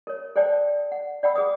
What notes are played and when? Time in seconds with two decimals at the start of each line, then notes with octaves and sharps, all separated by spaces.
0.07 A#4 C#5
0.36 A4 C5 D5 G5 A5
0.92 F#5
1.23 D5 F#5 G5 B5 E6
1.36 G#4 B4 D#6